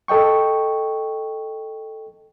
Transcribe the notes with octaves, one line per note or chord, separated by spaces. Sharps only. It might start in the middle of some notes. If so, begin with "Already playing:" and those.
A4 D#5 G5 C#6